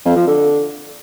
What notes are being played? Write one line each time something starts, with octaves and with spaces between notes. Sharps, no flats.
F2
F3
D3